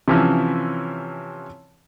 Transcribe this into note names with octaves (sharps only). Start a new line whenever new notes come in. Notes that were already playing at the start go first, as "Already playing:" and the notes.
C3 E3 F3 C#4